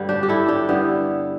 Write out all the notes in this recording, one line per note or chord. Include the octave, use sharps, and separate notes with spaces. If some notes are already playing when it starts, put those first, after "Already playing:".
Already playing: G2 D3 G3
D4 G4
G4
E4 A4
D4 G4
G2 D3 G3 B3 E4